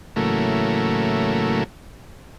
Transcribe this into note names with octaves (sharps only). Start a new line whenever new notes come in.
A2 C#3 E3 F#3 A3 A#3